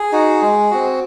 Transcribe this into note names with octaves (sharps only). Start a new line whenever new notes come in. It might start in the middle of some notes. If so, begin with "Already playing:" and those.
Already playing: G#4
D#4 F#4
G#3
C4 F#4